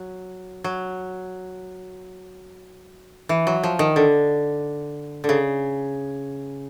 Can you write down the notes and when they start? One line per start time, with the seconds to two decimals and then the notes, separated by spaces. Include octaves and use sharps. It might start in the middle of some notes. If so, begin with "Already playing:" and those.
Already playing: F#3
0.64 F#3
3.29 E3
3.47 F#3
3.63 F3
3.79 D#3
3.96 D3
5.24 D3
5.29 C#3